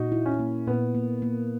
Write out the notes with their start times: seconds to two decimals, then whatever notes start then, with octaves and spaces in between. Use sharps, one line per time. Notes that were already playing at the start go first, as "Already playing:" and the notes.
Already playing: A#2 D#4 F#4
0.12 E4
0.26 C#4
0.39 A#3
0.67 A#2 B3
0.95 A#3
1.22 A#3